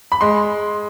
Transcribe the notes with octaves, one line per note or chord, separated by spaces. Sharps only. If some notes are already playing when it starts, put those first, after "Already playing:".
B5
G#3 C6